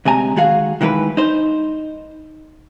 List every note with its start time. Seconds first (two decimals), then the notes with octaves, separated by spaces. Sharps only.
0.05 D2 C3 G#3 G#5 A#5
0.36 D#3 G#3 F#4 G#4 F5
0.81 D#3 E3 G#3 G#4 B4
1.17 D#4 C5